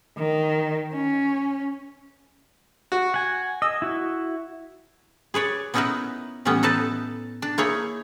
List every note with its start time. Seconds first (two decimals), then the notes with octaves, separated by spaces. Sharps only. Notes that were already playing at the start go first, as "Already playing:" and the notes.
0.18 D#3
0.93 C#4
2.92 F#4
3.14 F#5 G#5
3.62 D#5 E6
3.82 E4 F#4
5.34 G#4 B4 C#5 D5
5.74 B3 C#4 D#4 E4 A#4 B4
6.45 A2 E3 G3 B3 C#4
6.63 D#4 A4 B4 A5
7.42 D4
7.58 A#3 D#4 E4 G#4 C#5 F5